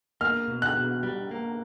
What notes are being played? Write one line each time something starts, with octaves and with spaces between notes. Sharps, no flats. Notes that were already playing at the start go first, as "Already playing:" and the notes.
A#3 F6
B2
F#6
B2
G3
A#3